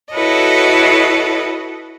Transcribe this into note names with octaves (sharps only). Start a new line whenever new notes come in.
E4 F#4 A4 B4 C#5 D#5